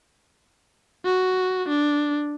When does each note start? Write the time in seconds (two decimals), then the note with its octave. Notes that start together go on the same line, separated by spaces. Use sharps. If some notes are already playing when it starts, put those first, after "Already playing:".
1.05 F#4
1.68 D4